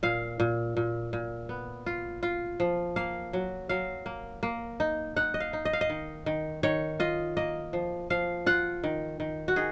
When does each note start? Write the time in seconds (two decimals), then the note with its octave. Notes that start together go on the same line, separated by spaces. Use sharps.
0.03 A#2 F5
0.40 A#2
0.77 A#2
1.13 A#2
1.49 B3
1.86 F4
2.23 F4
2.60 F3
2.96 A#3 F5
3.33 F#3
3.69 F#3 F5
4.06 A#3
4.43 A#3
4.80 D#4
5.16 D#4 F#5
5.34 D#5
5.40 F5
5.53 D#4
5.65 D#5
5.73 F5
5.81 D#5
5.90 D#3
6.26 D#3
6.63 D#3 C#5
7.00 F4 D#5
7.37 A#3 D#5
7.73 F3
8.10 F3 F5
8.46 F4 F#5
8.84 D#3
9.20 D#3
9.48 F#4
9.56 D#3 G#4